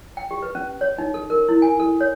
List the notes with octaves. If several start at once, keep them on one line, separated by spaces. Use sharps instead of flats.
G5
G4
B4
C#4
C#5
D#4
A4
A#4
E4
G#5
A4
C#5